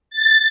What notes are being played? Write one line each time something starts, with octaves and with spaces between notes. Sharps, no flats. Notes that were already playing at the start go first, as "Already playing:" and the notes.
A6